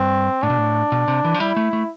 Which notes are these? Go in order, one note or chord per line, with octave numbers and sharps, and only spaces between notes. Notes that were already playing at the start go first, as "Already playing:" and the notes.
Already playing: G2 C4
A2 D4
B2
A2
B2
C3
E3
F3
G3 E4
A3
A3